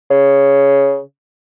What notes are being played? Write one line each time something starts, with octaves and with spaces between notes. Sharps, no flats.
C#3